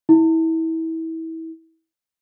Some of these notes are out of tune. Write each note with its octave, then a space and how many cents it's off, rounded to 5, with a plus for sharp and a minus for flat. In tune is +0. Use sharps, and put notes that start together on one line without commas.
E4 -30